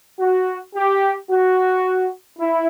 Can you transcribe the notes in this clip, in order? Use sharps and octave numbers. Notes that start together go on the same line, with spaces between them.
F#4
G4
F#4
E4